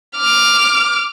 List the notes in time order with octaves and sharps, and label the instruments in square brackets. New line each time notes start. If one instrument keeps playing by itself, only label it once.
[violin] D6 F6